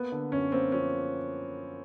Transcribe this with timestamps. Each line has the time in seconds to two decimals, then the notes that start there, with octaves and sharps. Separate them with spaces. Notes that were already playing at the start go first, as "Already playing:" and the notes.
Already playing: A#3 B3
0.12 D3
0.32 F#2 C#4
0.52 A#3 C4
0.72 F3 C#4